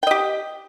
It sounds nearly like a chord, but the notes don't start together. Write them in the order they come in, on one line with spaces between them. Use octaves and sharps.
G5 D#5 G4